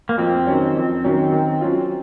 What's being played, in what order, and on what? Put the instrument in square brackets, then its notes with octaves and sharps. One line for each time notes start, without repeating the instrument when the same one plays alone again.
[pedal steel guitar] A#3
[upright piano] F2 [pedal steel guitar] C4
[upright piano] D#3 F#3 C#4
F2
D#3 F#3 C#4
D#3
F#3 C#4 F4